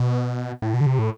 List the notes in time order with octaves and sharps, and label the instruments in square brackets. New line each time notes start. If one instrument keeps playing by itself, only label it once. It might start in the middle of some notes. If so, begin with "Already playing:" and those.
Already playing: [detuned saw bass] B2
A2
B2
D3
C3
A2